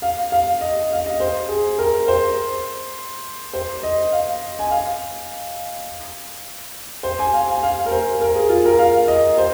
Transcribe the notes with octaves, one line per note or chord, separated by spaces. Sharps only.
F5
F5
D#5
F5
D#5
C5
G#4
A#4
C5
C5
D#5
F5
G#5
F5
C5
G#5
F5
G#5
F5
A#4
C5
A#4
G#4
F4
A#4
F5
D#5
C5